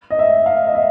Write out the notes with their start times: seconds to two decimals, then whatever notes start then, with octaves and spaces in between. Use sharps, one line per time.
0.11 D#5
0.19 E5
0.46 F5
0.67 D#5
0.75 E5